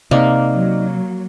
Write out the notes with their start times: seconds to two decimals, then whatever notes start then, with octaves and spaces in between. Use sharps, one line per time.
0.11 C3 A#3 D#4 D5 D#5
0.52 F#3